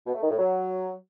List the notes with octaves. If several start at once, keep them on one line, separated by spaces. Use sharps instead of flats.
B2
A3
D#3
A2
F#3